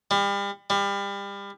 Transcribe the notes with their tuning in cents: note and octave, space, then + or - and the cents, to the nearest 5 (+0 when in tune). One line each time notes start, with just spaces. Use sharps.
G3 +35
G3 +30